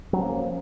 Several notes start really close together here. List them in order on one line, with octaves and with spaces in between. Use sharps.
F#3 C#4 F3 A#3